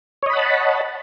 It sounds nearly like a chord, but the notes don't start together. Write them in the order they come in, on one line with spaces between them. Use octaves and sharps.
C#5 D#5 B5 F#5 A5